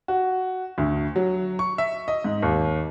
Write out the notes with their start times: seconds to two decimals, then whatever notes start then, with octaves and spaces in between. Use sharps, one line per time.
0.08 F#4
0.78 D2
1.16 F#3
1.59 C#6
1.78 E5
2.08 D#5
2.24 G#2
2.42 D#2